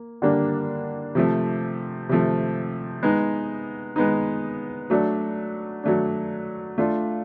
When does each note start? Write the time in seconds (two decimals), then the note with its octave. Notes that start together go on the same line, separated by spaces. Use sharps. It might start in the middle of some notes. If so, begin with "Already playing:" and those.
Already playing: A#3
0.22 D3 G3 A#3 D4
1.15 C3 F3 A3
2.09 C3 F3 A3
3.03 G#3 B3 D#4
3.96 G#3 B3 D#4
4.90 F#3 A3 D4
5.84 F#3 A3 D4
6.78 A3 D4 F4